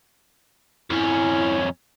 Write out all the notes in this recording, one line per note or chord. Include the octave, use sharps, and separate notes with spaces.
F2 C#4 E4